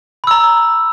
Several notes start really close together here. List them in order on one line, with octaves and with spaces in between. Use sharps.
B5 E6 A#5